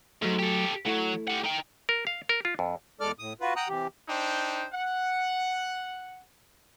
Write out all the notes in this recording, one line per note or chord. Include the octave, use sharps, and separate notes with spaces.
G#2 F#3 A3
G4 A4
F#3 A3 E4
G4 F#5
D#4 G5
A#4
F5
A#4
F4
F2
E2 G#3 A4 D5 D6 F6
A2 D#6
F4 F#4 B4
F#5 G5 A#5 D#6 F#6
C3 E3 G4
D4 D#4 C5 G5
F#5